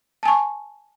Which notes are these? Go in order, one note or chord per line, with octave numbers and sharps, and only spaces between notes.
G#5 A5 C#6